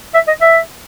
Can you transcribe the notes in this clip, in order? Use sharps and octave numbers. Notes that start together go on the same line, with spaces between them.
E5
D#5
E5